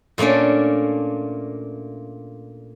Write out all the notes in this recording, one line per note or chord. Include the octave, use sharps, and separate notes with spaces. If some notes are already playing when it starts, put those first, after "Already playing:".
A#2 A3 A#3 C#4 D4